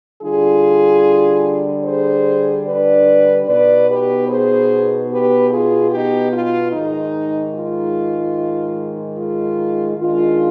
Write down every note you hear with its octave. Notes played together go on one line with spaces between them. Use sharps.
D3 G3 D4 F4 G#4
G#4 C5
B4 D5
B2 B3 D#4 B4 D5
G4 B4
G#4 C5
G4 B4
F4 G#4
D#4 G4
F4
G#2 D#3 G#3 D#4
F4
F4
D#3 G#3 D4 F4